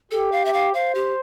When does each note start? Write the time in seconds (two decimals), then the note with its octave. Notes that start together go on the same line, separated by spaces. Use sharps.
0.11 G4 A4
0.32 F5
0.45 E5
0.53 F5
0.74 C5 F5
0.95 G4